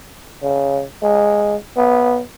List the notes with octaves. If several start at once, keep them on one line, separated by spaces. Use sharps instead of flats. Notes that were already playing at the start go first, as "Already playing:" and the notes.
C#3
G#3
B3